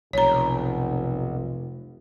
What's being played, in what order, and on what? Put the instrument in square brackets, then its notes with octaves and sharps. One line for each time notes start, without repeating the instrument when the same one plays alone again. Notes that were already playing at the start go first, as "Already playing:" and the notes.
[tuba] F1 [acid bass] B1 [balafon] C#5 A#5